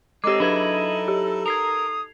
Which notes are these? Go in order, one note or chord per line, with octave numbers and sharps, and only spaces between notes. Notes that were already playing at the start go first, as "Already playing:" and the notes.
G#3 C4 D#4 G4 A4 D#5 D6
F#3 D4 E4 B4 G#6
G4
A#4 D#6 G#6 C7 F7